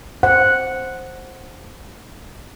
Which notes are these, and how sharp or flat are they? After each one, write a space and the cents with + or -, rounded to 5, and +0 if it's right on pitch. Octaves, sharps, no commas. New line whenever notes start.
C5 +5 F#5 -5